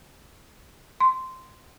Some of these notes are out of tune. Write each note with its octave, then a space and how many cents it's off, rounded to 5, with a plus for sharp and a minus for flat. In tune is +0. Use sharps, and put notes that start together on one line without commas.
C6 -10